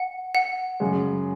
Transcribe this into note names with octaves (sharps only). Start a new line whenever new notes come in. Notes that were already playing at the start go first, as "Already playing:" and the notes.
Already playing: F#5
F#5
F#2 C#3 G#3